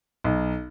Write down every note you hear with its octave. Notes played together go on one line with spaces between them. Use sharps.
B1